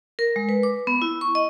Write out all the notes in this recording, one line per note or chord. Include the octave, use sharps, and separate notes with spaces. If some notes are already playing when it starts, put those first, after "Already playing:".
A#4
G#3
B4
D6
B3
E4
C#6
D#5